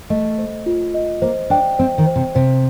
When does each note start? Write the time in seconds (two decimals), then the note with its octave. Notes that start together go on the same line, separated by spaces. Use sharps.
0.10 A3 D#5
0.38 C5
0.66 F4
0.94 D#5
1.22 A#3 C5
1.50 D4 G5
1.79 C4 C5
1.98 D#3
2.07 C5
2.16 C3
2.35 C3 C5